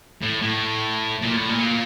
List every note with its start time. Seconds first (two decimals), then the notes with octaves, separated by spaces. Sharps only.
0.22 A2
0.42 A2
1.22 A#2
1.36 A2
1.49 A#2